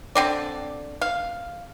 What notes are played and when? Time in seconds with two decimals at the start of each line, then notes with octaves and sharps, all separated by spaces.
0.15 D3 C4 D5
1.01 F5